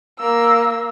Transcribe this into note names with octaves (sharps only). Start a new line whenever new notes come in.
A#3 E6